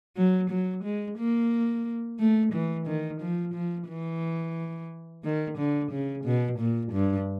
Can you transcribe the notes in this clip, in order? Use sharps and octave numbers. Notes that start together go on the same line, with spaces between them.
F#3
F#3
G#3
A#3
A3
E3
D#3
F3
F3
E3
D#3
D3
C#3
B2
A#2
G2